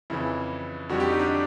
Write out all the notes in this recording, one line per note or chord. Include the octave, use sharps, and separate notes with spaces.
F2 C#3 E3 E4
F2 D3 G3 F#4
G4
D#4
D4